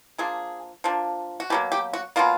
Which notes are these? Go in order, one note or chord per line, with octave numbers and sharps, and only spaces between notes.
F3 A#3 D4 G#4
F3 A#3 D4
F#4
B2 F#3 A#3 G4
G4
F#4
B2 F#3 A#3 F4